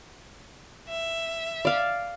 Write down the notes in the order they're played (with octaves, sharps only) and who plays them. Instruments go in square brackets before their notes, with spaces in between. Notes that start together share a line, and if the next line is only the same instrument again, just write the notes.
[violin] E5
[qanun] D5 F5